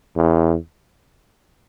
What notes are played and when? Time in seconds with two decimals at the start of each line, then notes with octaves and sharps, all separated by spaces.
0.16 E2